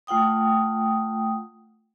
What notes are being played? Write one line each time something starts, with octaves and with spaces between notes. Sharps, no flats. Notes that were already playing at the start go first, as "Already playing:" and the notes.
A3 F4 F#5 G5 D#6